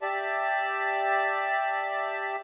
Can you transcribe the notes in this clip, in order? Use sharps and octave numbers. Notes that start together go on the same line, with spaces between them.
G4 D5 E5 A5